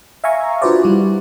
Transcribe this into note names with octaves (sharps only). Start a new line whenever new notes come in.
E5 F5 G#5 A#5 C#6
D4 F4 F#4 B4 C5 D5
G3 E4